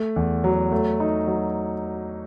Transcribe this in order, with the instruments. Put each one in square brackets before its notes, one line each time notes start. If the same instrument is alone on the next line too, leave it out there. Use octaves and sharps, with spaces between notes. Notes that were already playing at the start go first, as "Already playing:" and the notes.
Already playing: [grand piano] A3
E2
F#3
A3
D#4
F#3